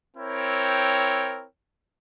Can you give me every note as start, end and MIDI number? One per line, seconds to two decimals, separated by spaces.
0.17 1.46 60
0.17 1.46 64
0.17 1.46 70
0.17 1.46 73
0.17 1.46 79